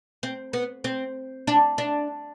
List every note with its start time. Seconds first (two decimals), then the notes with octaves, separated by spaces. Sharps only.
0.23 C4
0.53 B3
0.84 C4
1.47 D4
1.78 D4